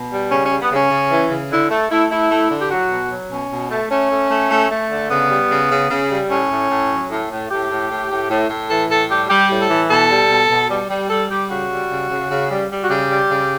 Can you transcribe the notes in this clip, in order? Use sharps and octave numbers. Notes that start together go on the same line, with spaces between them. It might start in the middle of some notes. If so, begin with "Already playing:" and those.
Already playing: B2
G3
C#3 C#4
C#4
G3
B3
C#3
C#4
C#3
E3
C#3
D3 E4
A3
A3 E4
A3 E4
A3
D3
G4
F#3 F#4
B2
F#3
B2 C#4
B2
A3
A3 C#4
A3
A3
A3
A3
D3
C#3 B3
G3
C#3
C#3
C#3
G3
A2 C#4
A2
A2
F#3
A2
A2
A2 G4
A2
A2
A2
A2
A2
E3 A4
A2 A4
G3 G4
G3 G4
A2
A4
E3
B2 A4
G3
B2
B2
G3
G3
G3 A4
G3 G4
C#3 F#4
G3
C#3
C#3
C#3
G3
G3
F#4
C#3 G4
G3
C#3